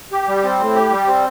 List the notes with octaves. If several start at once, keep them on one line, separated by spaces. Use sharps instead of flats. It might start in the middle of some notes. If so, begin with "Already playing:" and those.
G4
G3
C4
A2
G4
G3
C4